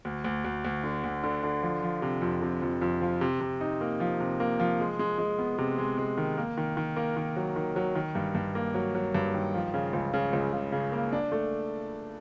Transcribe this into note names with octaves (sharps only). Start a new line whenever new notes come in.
D2
D2
D2
D2
D3
D2
D3
D3
F3
F3
C3
F2
C3
F2
F2
F3
C3
C3
D#4
A#3
F3
C3
A#3
F3
G#3
G#3
G#3
B3
C3
G#3
G#3
D#3
A#3
D#3
D#3
A#3
D#3
F#3
D#3
F#3
D#3
G2
G2
A#3
F#3
F#3
G2
D#3
F3
C#3
C#2
C#3
C#2
C#3
C#3
A#3
D4
A3